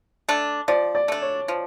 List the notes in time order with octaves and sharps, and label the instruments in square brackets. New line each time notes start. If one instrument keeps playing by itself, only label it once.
[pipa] A3 D4
[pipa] F3 [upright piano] D5
[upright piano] D5
[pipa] A3 D4
[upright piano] C#5
[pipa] F3